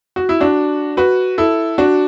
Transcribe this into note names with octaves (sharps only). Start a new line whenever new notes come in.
F#4
E4
D4 F#4
F#4 B4
E4 A4
D4 F#4